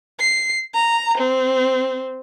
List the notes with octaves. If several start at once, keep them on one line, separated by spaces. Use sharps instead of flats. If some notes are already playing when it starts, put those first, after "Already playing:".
C7
A#5
C4